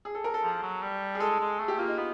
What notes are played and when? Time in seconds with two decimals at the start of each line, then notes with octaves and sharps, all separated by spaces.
0.05 G#4
0.15 A4
0.24 A#4
0.34 A4
0.43 F3
0.62 F#3
0.82 G3
1.15 G#4
1.20 G#3 A4
1.40 G#3
1.59 A3 G#4
1.68 G4
1.78 A#3 F4
1.88 D#4
1.98 B3